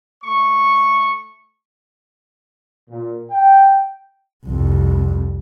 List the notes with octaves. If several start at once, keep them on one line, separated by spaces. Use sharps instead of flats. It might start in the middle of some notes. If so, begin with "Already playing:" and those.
A3 C#6
A#2
G5
C2 F2